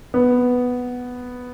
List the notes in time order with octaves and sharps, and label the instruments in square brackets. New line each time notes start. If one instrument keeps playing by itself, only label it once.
[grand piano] B3